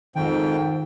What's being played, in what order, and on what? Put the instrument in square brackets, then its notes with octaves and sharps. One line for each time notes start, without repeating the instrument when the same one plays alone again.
[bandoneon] F2 G#2 G5 [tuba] D#3